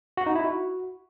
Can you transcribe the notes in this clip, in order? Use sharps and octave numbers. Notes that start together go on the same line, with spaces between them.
F#4
D#4
E4
F#4